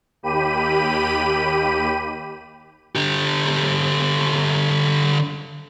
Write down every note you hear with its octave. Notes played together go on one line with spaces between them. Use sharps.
D#2 G4 B5 D#7
D3 G4